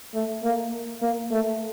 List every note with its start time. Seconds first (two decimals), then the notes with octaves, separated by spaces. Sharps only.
0.15 A3
0.44 A#3
1.02 A#3
1.31 A3